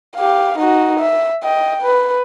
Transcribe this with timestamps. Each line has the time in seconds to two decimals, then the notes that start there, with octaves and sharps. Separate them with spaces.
0.16 G4 F5
0.58 D#4 F#4
1.00 E5
1.43 D#5 G5
1.82 B4